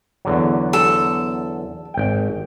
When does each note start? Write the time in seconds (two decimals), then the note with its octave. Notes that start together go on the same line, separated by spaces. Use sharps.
0.25 E2 D3 F#3
0.73 A4
1.94 G#1 G5